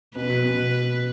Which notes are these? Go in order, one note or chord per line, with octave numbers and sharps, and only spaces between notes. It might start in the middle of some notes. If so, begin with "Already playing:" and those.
B2 B4
B2